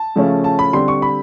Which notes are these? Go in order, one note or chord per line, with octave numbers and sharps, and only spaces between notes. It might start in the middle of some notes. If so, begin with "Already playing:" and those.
Already playing: A5
C#3 F3 A3 C#4
A5
B5
D3 G3 C4 C6
C#6
B5